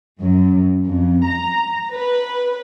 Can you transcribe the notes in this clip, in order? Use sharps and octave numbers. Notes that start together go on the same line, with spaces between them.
F#2
F2
A#5
B4